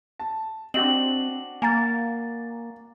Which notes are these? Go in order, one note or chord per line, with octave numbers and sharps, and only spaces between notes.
A5
C4 D4 F#4 D#5 F#7
A#3 G#5 A#5 A6